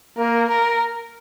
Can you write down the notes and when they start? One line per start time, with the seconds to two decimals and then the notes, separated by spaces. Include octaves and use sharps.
0.18 A#3 A#4
0.49 A#4